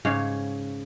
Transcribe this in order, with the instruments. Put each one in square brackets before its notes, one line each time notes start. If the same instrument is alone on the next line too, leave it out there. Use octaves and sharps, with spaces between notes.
[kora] G#2 C#3 C#5 F5